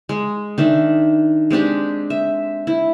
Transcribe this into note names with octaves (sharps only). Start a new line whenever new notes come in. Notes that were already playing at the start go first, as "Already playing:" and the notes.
G#3
D#3 D4 E5
G#3 C4 D4 G4
E5
E4